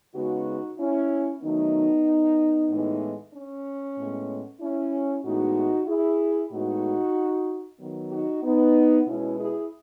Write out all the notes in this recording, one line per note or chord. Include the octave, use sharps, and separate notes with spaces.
C#3 G#3 B3 D#4 F#4
C#4 E4
D#3 F#3 A3 B3 D#4
A2 E3 G#3 B3
C#4
A2 G#3 B3
C#4 E4
A2 E3 G#3 B3 D#4 F#4
E4 G#4
A2 G#3 B3 D#4 F#4
D#3 F#3 B3
D#4 F#4
B3 D#4
B2 G#3 B3 C#4 E4
E4 G#4